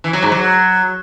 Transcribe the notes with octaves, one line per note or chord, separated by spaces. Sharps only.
E3
F#3
G#2
F#3